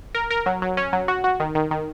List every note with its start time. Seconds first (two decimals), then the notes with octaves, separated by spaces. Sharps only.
0.15 A#4
0.30 A#4
0.46 F#3
0.62 F#3
0.77 C#4
0.93 F#3
1.08 F#4
1.24 F#4
1.40 D#3
1.55 D#3
1.71 D#3